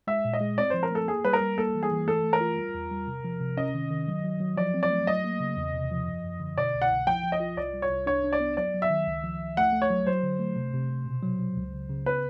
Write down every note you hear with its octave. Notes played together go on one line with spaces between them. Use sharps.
G#3 E5
A#2
D#5
G#3
C4 D5
F3 C5
A#4
A3 A4
A#3 G#4
G3 B4
A#4
G3
A#3 A4
E3
G#4
E3
A3 A4
A3
A#4
F4
G3
E2
G3
C3
F3
C3
C#4 D#5
D#3
D#3
F#3
F#3
F#3
F3 D5
C4
D5
A3
F#3 D#5
A#3
C#3
E2
C3
F3
F#2
F#2
D3
B2 D5
C2
F#5
C2
F3 G5
F3
D#5
F4
C2 D5
G3
C#5
C2
D4 C#5
D4
D5
B3
F#3 D5
F#3
E5
D#3
C#2
F3
C#2
A3 F#5
A3
C#5
F#3
F#3 C5
D3
A3
C3
C3
C3
B2
F#3
F#3
C#2
C#3
C#3
B3 B4